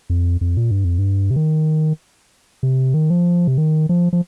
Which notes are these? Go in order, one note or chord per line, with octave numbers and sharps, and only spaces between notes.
F2
F2
A#2
G2
F2
G2
C3
D#3
C3
D#3
F3
C3
D#3
F3
F3